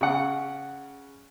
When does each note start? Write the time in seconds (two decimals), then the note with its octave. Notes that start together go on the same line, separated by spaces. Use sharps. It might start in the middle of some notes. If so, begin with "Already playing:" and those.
0.01 C#3 F#5